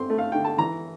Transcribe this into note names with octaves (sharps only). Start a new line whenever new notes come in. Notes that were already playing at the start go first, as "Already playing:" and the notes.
Already playing: D3 C4 C6
A3
F5
D3 G5
A5
E3 A#5